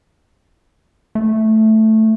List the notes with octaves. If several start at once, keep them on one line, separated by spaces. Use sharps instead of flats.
A3